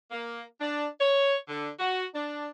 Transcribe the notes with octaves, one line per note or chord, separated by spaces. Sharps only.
A#3
D4
C#5
D3
F#4
D4